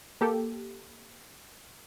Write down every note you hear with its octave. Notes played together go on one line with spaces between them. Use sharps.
A#3 G4 A4